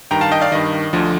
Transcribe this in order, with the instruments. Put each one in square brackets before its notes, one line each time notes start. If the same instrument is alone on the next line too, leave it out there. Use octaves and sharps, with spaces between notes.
[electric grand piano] G2 D#3 G5 A#5
F5 A5
D#5 G5
D5 F5
G2 D#3 D#5
D2 D3 F3